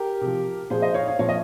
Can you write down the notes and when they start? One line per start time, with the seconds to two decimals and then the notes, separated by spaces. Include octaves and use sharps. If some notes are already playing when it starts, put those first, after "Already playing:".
Already playing: G4 A#4
0.21 C3 F3
0.70 A#2 F3 G#4 C5
0.82 C5 D#5
0.94 C#5 F5
1.08 C#5 F5
1.19 A#2 F3 C#5 F5
1.29 D#5